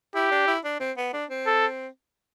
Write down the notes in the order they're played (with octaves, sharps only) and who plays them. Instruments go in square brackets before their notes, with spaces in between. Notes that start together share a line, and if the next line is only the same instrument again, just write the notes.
[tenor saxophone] E4 [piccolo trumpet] G4
[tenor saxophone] D4
E4
D4
C4
B3
D4
C4
[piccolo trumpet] A4